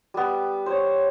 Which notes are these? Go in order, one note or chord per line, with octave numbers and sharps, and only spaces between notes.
G3 B3
C5 C#5